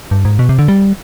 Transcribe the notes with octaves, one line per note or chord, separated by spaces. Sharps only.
G2
G#2
B2
C3
D3
G3